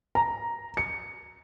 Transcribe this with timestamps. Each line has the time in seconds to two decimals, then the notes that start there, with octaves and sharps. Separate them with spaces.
0.15 A#5
0.77 C#7